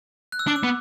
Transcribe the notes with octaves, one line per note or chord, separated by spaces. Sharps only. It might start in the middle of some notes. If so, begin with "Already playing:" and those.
F#6
E6
D4 D6
E6
B3